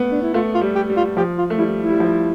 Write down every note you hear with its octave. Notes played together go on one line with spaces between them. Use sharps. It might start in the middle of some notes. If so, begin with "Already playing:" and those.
Already playing: A3 B3
D4
E4
A3 F4
F4
G3
G4
G3
F4
F3 G4
F4
A3
G3 E4
E4
G3
F3